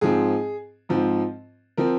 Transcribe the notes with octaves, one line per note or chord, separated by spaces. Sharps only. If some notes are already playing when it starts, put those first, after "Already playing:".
G#2 F3 C4 G#4
G#2 F3 C4
F3 C4 A#4